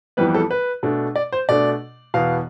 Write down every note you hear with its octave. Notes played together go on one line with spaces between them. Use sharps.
F2 E3 G3 B3 B4
A4
B4
B2 A3 D4
D5
C5
B2 A3 D4 D5
E2 B2 B3 F5